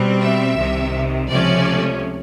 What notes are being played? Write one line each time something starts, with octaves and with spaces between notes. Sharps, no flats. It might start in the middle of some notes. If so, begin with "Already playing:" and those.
Already playing: B2 G3 C4
E5
C2 C3 D#3
C#2 C3 F3 A3 C#4 D5